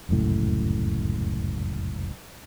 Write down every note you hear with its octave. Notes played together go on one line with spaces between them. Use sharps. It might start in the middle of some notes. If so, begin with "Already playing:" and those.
F1 C#2 F#2 A2